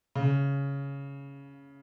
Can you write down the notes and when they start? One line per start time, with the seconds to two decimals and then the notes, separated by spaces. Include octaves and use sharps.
0.15 C#3